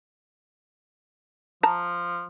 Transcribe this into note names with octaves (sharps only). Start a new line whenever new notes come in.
F3 A5 A#5